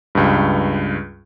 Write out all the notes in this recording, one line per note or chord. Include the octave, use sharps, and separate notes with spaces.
C#2 G2